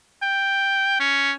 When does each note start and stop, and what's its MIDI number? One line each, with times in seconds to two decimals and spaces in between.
0.22 0.97 79
1.00 1.31 61